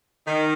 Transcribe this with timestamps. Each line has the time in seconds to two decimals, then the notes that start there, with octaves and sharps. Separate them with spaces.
0.27 D#3